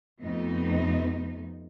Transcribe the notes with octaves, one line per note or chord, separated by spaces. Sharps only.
F2 C3 A3 B3 D#4